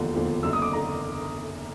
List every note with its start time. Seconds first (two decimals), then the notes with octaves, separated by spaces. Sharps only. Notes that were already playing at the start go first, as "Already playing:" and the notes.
Already playing: E1 D#2 D3 F3
0.13 E1 D#2 D3 F3
0.43 F#1 F#2 D3 E6
0.53 D#6
0.62 D6
0.73 D3 A#5